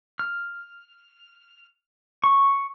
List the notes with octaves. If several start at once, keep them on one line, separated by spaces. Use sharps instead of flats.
F6
C#6